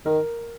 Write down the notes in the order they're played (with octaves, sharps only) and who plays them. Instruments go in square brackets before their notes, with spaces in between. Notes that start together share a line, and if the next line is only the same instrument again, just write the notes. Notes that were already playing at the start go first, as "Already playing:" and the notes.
[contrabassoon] D#3 [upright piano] A#4